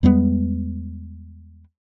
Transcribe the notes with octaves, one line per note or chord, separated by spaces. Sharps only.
E2 G3 G#3 B3